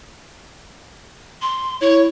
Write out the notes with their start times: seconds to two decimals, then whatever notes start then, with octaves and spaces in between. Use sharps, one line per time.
1.42 C6
1.81 E4 C#5